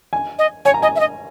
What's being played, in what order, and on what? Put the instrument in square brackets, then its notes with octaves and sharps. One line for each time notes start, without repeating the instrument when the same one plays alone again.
[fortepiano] G#5
[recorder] D#5
[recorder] C#5 [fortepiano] G#5
[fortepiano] A#5
[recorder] D#5 [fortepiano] G#5
[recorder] E5
D#5